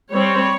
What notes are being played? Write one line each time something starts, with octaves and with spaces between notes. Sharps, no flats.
G3 C4 C#5